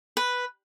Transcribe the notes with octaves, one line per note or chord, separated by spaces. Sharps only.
B4